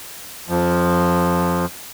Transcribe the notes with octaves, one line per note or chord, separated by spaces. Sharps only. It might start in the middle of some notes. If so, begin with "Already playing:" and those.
F2 F3